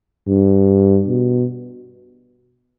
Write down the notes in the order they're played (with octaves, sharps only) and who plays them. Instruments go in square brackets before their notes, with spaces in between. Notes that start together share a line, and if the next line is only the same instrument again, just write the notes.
[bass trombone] G2
B2